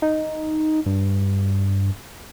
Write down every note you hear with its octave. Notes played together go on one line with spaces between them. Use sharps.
D#4
G2